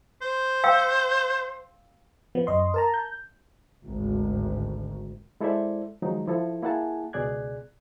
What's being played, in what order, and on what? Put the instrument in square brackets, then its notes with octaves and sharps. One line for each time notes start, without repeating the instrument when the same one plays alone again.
[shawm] C5
[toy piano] F5 G5 E6
[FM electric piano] F3 B3
F#2 D#5 C6
A#4 A5 A#5
G6
[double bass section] G#1 D2
[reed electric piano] G#3 E4 A4 C5 D5 E5
D#3 F3 F#3 G#3 D#4
F3 E4 A4
A#3 E4 G#4 F#5 G#5 A5
C#2 B2 G#4 D5 F#6 G#6